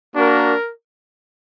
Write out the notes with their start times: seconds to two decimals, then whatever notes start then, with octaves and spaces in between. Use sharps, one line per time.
0.15 A#3 D4 F#4 A#4